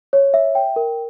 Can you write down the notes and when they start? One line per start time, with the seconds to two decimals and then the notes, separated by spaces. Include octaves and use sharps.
0.13 C#5
0.34 E5
0.55 G5
0.76 A#4